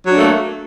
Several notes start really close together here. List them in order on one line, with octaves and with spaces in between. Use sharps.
F#3 D4 A3 A#3